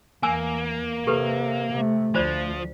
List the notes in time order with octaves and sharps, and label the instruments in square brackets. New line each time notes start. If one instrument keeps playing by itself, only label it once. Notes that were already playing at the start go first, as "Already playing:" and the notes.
[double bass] E2 [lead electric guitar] A#3 [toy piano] G#5 E6
[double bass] C3 [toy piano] G4 A4 B4
[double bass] C3 A3
[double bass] D2 [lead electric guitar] F3 [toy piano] F4 C5 D5